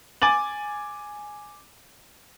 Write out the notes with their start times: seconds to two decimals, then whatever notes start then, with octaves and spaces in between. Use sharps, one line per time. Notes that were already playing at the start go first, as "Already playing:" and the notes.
0.22 G#5 D6 A6 F#7